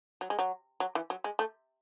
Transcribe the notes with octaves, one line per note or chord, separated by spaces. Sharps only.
F#3
G#3
F#3
F#3
E3
F#3
G#3
A3